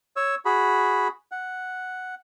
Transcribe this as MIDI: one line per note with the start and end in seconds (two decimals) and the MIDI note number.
0.16 0.35 73
0.16 0.35 88
0.46 1.08 66
0.46 1.08 68
0.46 1.08 83
1.32 2.15 78